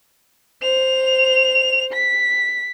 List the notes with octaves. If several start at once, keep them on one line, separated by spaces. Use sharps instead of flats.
C5 F7
B6